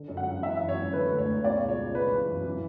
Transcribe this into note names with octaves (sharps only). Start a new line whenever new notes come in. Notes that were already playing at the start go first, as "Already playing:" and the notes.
Already playing: D3
F#2
F#5
F#2
E3 E5
F#2
C#5
F#2
D3 B4
D2
C#5
D2
B2 D5
C#2
C#5
C#2
C#3 B4
E3
F#2
E3